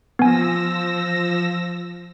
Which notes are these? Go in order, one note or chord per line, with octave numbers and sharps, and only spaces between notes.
F3 B3 G#5 E6 A#6